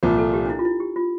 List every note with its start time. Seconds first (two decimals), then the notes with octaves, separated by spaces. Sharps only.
0.03 C2 A#2 F3 A#4
0.18 A4
0.34 G4
0.46 D4
0.50 E4
0.59 F4
0.65 E4
0.80 G4
0.96 F4